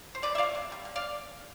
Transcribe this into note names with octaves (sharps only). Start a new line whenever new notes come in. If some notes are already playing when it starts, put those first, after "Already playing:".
C5
D3 B4 D5
E5
F3 A3 D5 F5
C3
G3 B3
D3
D5 F5